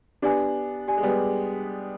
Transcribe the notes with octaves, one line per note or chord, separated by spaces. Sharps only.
B3 D4 G4 D5 G#5
G4 D5 G#5
G#3
G3 B3